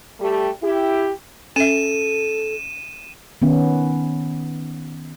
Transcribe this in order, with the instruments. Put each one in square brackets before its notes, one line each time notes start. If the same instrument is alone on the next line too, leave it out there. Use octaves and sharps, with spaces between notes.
[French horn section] G3 A3 G4
E4 G4
[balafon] C#4 E5 [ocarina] A4 [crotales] D#7 E7
[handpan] D#3 B3 C#4